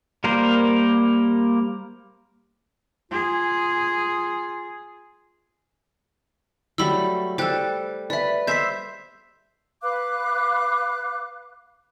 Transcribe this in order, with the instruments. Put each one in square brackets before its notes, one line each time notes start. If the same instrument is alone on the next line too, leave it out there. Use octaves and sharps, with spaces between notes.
[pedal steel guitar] G3 A#3 A#4 C5
[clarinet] F4 [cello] G#4
[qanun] F#3 G3 A3 [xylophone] B5 E6
[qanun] G3 A4 [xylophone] C5 G5 F#6
[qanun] B4 B5 [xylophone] D5 E5
[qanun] C5 E5 [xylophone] G6 B6
[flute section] B4 F5 D6 F#6